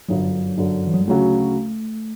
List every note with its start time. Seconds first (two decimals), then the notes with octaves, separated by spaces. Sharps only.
0.09 G1 F#2 D3 F#3
0.57 G1 F#2 D3
0.87 E3
0.94 F#3
1.01 G3
1.07 D2 C#3 F#3 A3 C#4 F#4